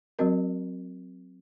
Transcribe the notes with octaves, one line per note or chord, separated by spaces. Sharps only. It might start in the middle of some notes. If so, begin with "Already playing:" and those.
F#3 C4 F#4 A#4 D#5